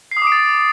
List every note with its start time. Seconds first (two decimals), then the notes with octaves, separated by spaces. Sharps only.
0.11 C7
0.17 D#6
0.22 D6
0.27 D7
0.32 A6